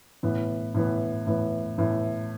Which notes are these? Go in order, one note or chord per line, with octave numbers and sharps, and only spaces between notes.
A2 E3 B3
A2 E3 B3
A2 E3 B3
A2 E3 B3